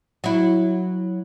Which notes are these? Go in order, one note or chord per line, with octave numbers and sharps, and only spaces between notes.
F#3 E4